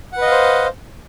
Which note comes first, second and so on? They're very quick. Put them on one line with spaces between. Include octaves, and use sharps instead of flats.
F#5 B4 D#5 F5 C5